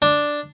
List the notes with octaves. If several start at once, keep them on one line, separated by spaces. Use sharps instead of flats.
D4